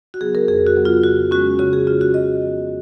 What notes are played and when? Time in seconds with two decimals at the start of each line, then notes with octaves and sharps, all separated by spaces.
0.14 F#4
0.21 C#3 F#3 B3 G#4
0.35 A#4
0.48 F2 G#4
0.67 F#4
0.76 C#3 F#3 B3
0.85 F4
1.03 C#3 F#4
1.31 G#3 C#4 F#4
1.59 C#3 F#4
1.73 G#4
1.86 G#3 C#4 F4
2.01 F#4
2.14 C#3 D#5
2.42 F3 B3